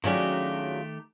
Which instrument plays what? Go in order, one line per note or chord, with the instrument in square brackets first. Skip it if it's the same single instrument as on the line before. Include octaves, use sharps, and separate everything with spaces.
[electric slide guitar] D#3 A3 G4 [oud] F#3 C#4 D4 [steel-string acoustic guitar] F4 G#4